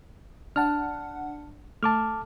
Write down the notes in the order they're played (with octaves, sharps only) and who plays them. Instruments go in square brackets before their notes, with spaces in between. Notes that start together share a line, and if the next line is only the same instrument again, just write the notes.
[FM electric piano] D4 F#5 [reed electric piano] A5 F6
[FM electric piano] A3 [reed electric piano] A5 D6 F6